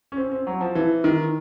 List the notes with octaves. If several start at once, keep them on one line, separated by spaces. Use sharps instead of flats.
C#4
C4
C4
F#3
F3
E3
D#3